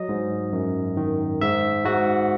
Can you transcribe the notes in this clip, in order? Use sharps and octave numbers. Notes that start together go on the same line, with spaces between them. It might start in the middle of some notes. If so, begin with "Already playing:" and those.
Already playing: F#3 D#5
G#2
F#2
D#3
G#2 E5
G#2 F#4